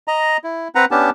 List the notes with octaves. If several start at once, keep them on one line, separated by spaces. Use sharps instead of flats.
D#5 A#5
E4
C4 B4 F#5 A#5
B3 C#4 D4 G4 A5